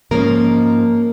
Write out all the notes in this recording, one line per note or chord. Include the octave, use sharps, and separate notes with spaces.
G#2 F3 G#3 A#3 C#4 A#4